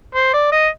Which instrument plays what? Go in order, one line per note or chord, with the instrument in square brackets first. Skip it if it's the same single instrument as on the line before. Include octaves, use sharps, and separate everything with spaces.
[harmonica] C5
D5
D#5